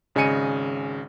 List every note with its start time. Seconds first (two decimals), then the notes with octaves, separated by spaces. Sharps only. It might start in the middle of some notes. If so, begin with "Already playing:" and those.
0.15 G#1 C#3 D#5 G#5 C#7 D#7